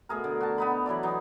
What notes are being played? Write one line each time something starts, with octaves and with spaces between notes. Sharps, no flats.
B2 A3 G#4 A#4
D3
F#4 A5
B3 D#4 B5
E3 F#3 E4 D5
E3 F#3 D#4